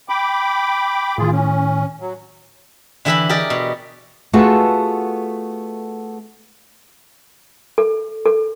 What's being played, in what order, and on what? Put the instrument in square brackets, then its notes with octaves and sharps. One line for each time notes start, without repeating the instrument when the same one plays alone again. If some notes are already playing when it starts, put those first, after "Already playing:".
[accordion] G5 B5 D6
[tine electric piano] A2 D#3 [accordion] F4 G#4
[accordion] C#4
F#3
[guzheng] D3 E3 G4 E5 G#5 B5
G4 G#4 A#4 D5 D#5
B2
[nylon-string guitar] A3 B3 F4 F#4 G#4 A4
[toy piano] A4
A4